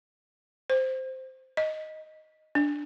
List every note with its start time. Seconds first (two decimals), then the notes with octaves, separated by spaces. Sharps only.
0.70 C5
1.57 D#5
2.55 D4